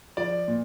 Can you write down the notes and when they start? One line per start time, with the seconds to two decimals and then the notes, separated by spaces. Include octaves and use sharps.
0.17 F3 D5
0.48 A#2